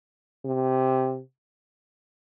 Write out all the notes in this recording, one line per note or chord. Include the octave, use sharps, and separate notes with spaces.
C3